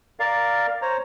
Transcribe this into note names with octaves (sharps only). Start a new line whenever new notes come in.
A#4 D5 F5
C5 C#5 A#5